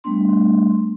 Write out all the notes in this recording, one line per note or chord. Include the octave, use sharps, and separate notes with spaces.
G3 A3 B3 D4 C6